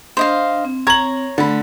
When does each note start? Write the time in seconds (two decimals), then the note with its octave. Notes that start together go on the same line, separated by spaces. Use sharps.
0.17 D4 C5 D#5 F5
0.65 C4
0.87 C#5 A#5 G#6 F#7
1.38 D3 A3 A5 B5